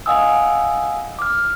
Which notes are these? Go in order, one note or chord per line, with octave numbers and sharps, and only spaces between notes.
D#5 F5 F#5 G#5 D#6 E6
D6 F6